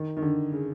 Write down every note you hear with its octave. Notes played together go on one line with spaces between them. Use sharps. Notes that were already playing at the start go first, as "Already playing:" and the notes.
Already playing: D#3
D#3
D3
C#3